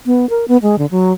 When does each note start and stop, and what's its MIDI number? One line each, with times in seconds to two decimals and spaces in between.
0.06 0.28 59
0.30 0.45 70
0.48 0.57 59
0.62 0.78 56
0.78 0.86 50
0.91 1.13 54